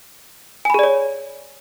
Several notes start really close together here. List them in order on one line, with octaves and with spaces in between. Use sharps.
G#5 B5 G#4 D5 C#5